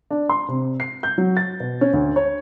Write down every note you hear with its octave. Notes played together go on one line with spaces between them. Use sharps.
D4
C6
C3
C7
G6
F#3
A6
B2
C#4
D2
C#5